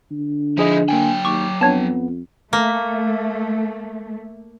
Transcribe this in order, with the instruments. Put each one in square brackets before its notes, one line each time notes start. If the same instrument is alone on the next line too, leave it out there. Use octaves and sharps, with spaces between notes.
[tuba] D3
[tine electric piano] F3 G#4 D#5 [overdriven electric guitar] D#4 E4
[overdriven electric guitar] F#3 G5 [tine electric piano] A#3 G#5
[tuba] D#2 [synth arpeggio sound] C#6 [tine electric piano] D6
[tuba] F2 [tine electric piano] B3 [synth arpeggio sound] D4 C#5 A5
[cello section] A3 [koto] A#3